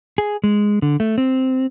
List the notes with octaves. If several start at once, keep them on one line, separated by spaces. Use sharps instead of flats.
G#4
G#3
D3
A3
C4